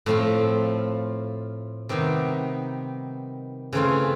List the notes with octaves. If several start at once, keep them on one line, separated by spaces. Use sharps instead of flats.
A2 F3 A3 C4 F4
C3 D#3 G3 B3 D#4
C#3 E3 A3 C4 F4